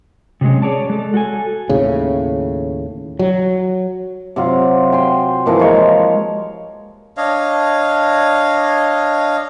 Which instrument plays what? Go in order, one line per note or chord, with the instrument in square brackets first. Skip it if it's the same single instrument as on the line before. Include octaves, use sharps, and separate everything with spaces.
[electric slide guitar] C3 F#3 G#3 C#4
G#4 C#5 D5 A5
G#3 A4
F#4 A4 G#5
[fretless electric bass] D#2 A2 C#3
F#3
[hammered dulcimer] C3 F#3 F4
G5 G#5 C6
A#2 E3 F3 A#4
F3 G#3 C#5 F5
[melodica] D4 C#5 D#5 F5